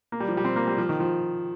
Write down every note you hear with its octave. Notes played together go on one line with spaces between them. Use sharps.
A#3
G3
F3
G3
C4
A#3
G3
F3
D#3
F3